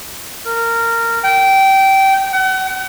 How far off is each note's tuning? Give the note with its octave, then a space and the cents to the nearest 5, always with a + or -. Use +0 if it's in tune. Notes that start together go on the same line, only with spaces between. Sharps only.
A#4 -15
G5 -20
F#5 +40